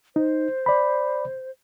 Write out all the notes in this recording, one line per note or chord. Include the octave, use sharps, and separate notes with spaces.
D#4 C5
D5 B5